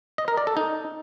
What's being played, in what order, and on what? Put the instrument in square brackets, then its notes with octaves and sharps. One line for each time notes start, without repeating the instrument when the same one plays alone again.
[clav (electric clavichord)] D#5
A#4
D5
A4
D#4